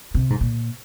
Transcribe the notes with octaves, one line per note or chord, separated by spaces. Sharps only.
C3
G#2
A#2